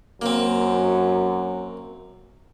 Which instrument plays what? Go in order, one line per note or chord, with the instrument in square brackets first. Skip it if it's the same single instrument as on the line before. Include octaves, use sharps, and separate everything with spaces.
[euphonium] F#2 [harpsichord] A#3 C4